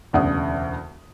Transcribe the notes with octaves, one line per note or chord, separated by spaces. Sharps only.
E1 D2 C#3 D5 F#5 D#6